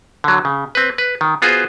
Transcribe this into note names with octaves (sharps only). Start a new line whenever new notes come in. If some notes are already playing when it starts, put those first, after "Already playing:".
D3 F#3
C#3
C4 B4
B4
D#3
B3 F4 F#4 G#4 C5